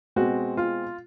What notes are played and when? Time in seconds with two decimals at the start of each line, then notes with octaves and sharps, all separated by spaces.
0.16 B2 G#3 C4 F#4
0.57 F4